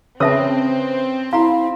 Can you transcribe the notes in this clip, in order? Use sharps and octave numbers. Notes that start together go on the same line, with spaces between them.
C#3 C4 B4 C#5 E5 A5 D#6
E4 F5 A#5 C6